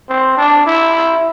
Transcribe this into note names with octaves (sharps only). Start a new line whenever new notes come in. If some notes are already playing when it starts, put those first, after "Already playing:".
C4
D4
E4